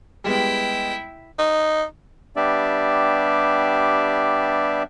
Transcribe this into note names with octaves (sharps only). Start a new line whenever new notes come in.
G3 G#3 B3 E4 G5
D#4
G3 B3 D4 G4 D5 E5